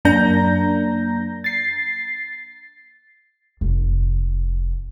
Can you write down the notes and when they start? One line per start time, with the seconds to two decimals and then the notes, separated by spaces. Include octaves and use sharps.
0.05 F#2 A#3 D4 A#5 G6 A#6
1.44 A6 C7
3.61 F1